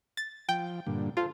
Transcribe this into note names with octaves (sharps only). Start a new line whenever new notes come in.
A6
F3 G5
G2 A#2 D3
F4 A4 C5